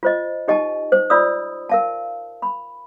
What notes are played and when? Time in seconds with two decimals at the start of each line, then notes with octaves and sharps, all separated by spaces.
0.03 F4 C5 D#5
0.48 D#4 G4 D#5 G#5 A5
0.92 C5
1.10 F4 D5 B5 D#6 E6
1.69 A#4 F5 A5
2.42 B5